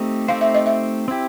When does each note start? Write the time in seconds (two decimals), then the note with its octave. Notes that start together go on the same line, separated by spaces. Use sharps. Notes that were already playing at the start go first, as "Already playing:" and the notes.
Already playing: A3 C4 D#4 G4
0.28 A3 C4 D#4 G4 C5 F5
0.41 E5
0.54 D#5
0.66 E5
1.08 C4 E4 G4